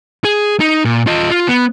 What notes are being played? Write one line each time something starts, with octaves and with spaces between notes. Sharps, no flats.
G#4
D#4
A#2
F4 D#5
F4
B3